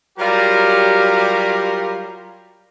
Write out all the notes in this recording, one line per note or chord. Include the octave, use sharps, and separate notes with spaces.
F#3 G3 F4 G4 A#4